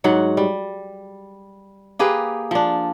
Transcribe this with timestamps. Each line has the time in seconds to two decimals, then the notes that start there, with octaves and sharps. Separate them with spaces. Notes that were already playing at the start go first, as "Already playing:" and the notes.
0.04 G#2 F#3 F#5
0.37 G3
1.99 A#3 G4 G#4 B4
2.51 F3 D4